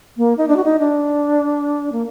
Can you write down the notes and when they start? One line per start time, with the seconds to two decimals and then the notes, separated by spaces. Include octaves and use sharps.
0.17 A#3
0.38 D#4
0.48 D4
0.56 F#4
0.64 D#4
0.79 D4
1.92 A#3